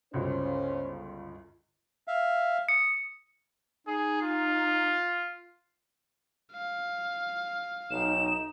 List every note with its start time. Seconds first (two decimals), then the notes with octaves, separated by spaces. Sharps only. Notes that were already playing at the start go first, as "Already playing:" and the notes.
0.13 G1 C#2 C#4 F#4 C5
2.08 E5 F5
2.69 D#6 C#7
3.87 D#4 G#4
4.22 F4
6.53 F5
7.91 B1 D#4 E7